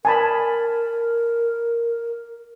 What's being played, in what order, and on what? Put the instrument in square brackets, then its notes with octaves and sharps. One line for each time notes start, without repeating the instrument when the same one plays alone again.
[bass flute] A#4 [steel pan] G#5 A5 B5